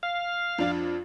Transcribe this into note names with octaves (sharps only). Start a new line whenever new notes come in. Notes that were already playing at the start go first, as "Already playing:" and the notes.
F5
F2 D4 F4